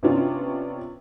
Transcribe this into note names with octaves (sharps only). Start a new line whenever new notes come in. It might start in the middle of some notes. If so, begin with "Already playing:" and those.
C3 B3 C#4 D4 F4